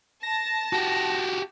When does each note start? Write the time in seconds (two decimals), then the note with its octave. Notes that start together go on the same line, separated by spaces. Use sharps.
0.23 A5 A#6
0.73 F#4 G4